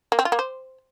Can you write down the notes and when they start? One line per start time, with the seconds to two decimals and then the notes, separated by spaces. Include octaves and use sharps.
0.12 A#3
0.19 C4
0.25 F4
0.32 A#3
0.39 C5